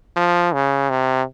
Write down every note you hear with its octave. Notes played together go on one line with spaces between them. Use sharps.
F3
C#3
C3